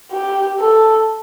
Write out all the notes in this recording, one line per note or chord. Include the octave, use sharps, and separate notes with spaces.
G4
A4